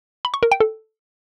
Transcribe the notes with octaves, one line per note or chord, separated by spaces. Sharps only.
B5
C#6
A#4
G5
A4